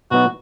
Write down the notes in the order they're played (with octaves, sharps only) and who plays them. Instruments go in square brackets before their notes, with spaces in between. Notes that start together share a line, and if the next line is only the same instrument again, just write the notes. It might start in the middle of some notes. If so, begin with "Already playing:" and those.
[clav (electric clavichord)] B2 F#3 B3 D#4 [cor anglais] F#4